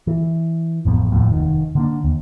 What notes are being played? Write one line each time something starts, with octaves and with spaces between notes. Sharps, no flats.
E3
A1 F2 F3 B3
F#1 D#2 A2 F3
F1 D#3
D3 A#3 D4
D#2